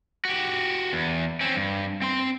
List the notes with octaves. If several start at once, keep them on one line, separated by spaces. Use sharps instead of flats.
F#4 G4
E2
C4 C#4
G2
C4 C6